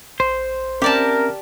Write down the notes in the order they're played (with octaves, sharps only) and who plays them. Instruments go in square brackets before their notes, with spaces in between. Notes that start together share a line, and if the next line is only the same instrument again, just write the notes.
[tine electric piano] A#1 [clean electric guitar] C5
[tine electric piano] C4 C#4 E5 [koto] G4 D5 A5 [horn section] A#4